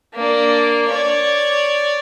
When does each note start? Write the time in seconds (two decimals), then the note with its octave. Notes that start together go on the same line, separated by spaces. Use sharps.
0.14 A#3 D4
0.89 C#5 D5